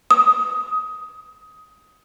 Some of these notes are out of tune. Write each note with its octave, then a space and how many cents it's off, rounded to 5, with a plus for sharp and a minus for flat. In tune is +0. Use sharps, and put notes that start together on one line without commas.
D#6 +15